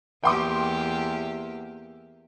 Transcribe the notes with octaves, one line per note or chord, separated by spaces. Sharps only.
E2 A#3 G4 G5 C6 D6